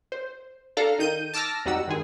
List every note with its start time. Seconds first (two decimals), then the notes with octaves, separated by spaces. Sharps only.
0.12 C5
0.77 D4 A4 F5 A#5
0.99 D#3 D#4 G6 D#7
1.34 A5 D6 E6 F6 A#6
1.65 F2 G3 D#4 F#4 F#5 E6
1.87 G2 D#3 G#3 G#4